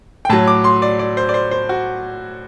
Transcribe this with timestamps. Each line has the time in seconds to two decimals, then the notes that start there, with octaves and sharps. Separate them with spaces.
0.25 G5
0.30 A2 F#3 A5
0.47 D6
0.64 C6
0.82 D5
0.99 D5
1.17 C5
1.29 D5
1.34 C5
1.51 C5
1.69 F#4